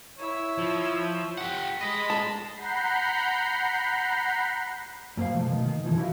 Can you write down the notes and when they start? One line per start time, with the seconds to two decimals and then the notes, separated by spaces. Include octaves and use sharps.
0.19 E4 C#5 E6
0.58 F3
1.38 G4 F#5
1.81 G#3 D#5 B5
2.10 A5
2.56 F#5 A#5 B5 G6 C7
5.17 F#2 A#3 C5 F5
5.33 B2 F3 A3
5.49 B2 D#3
5.65 D#3
5.84 F#2 A2 E3 F3
5.97 E4 F#4 C5 E5 F5